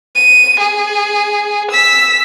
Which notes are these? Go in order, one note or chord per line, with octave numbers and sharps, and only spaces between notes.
D#7
G#4
E6 B6